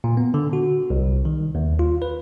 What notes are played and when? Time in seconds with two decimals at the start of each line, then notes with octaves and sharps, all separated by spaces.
0.04 A#2
0.17 B3
0.34 D3
0.53 F#4
0.90 C2
1.25 D#3
1.55 D#2
1.79 F4
2.02 B4